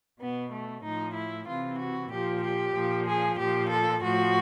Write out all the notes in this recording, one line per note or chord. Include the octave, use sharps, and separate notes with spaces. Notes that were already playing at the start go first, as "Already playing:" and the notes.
B2 B3
A3
A2 F3 D#4
E4
C3 E3 F4
F#4
A#2 F3 G4
G4
A#2 F3
G#4
A#2 F3 G4
A4
A2 F3 F#4